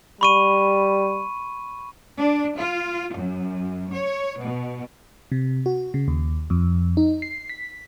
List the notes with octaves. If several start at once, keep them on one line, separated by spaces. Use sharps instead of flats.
G3 B5 C#6 D#7
D4
F4
F#2
C#5
B2
C3
F#4
C#3
D#2
F2
D#4
C7
B6